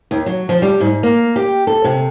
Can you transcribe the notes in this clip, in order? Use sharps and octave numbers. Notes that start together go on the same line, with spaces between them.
D#2
F#3
F3
G3
G#2
A#3
G4
A4
C3